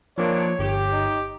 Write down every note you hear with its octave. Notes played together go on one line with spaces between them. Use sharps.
A#2 D#3 F3 A#3 D4 C#5
G1 G4
D#4